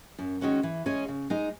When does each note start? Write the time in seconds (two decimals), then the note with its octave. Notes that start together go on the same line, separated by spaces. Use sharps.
0.19 F#2
0.41 D#3 G#3 C#4 F#4
0.63 E3
0.86 G#3 C#4 G#4 C#5
1.08 C#3
1.30 G#3 D#4